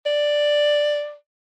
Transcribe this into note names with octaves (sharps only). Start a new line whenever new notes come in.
D5